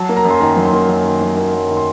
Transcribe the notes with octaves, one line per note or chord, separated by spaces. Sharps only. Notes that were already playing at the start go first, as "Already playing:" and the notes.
Already playing: F#3 A5
A#3
A#5
F#2
C6
D#3 A#5
F#3
C6
A#3
F#2
D#3
F#3
A#3
F#2
D#3
C6